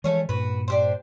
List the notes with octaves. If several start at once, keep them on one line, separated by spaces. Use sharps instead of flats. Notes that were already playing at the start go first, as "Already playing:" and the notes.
E3 F3 G#3 A3 C#4 C#5
G2 A#2 F#4 B4
D4 G4 C5